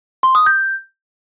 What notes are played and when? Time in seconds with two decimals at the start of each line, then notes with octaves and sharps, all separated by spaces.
0.23 C6
0.35 D#6
0.46 G6